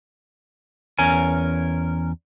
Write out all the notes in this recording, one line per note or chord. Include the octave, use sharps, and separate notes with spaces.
E2 C#4 A#4 G#5